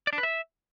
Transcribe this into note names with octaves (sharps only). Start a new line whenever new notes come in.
D5
D4
B4
E5